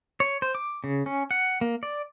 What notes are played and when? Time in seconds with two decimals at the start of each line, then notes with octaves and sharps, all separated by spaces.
0.20 C#5
0.42 C5
0.55 D6
0.84 C#3
1.06 C#4
1.31 F#5
1.61 A#3
1.83 D5